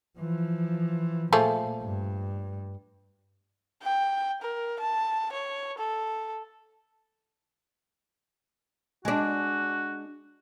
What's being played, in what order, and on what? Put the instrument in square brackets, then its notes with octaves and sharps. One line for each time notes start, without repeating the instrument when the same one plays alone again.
[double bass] E3 F3
[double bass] A#2 [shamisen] F3 A3 G#4
[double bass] G2
[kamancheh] G5
A#4
A5
C#5
A4
[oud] G#3 D4 [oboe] F#4